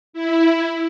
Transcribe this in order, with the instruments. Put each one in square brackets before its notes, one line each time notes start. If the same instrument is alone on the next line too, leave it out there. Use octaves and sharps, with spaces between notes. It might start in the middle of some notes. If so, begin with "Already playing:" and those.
[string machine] E4